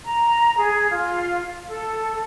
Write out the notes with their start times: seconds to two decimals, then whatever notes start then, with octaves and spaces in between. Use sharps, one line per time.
0.05 A#5
0.58 G#4
0.92 F4
1.68 A4